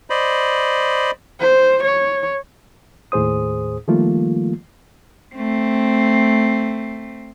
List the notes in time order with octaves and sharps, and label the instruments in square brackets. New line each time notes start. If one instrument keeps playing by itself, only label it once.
[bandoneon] C5 D5 D#5 B5
[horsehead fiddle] C5
C#5
[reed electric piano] D#2 A2 G#4 C5 D#6
D#3 F3 G3 A3 A#3 F4
[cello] A3 C4